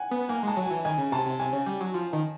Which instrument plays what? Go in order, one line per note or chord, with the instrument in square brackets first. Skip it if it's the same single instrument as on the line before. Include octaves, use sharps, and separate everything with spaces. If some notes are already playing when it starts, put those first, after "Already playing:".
Already playing: [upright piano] F#5 G#5
[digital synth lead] B3
[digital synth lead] A#3 [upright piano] G#5
[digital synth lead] G#3
[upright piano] A5
[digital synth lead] F#3
[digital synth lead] E3 [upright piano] G#5
[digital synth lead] D#3 [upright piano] G#5
[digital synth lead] C#3
[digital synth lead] C3 [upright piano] A5
[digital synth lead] C3
[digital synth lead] C3 [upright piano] G#5
[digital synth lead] C#3
G3
F#3
F3
D#3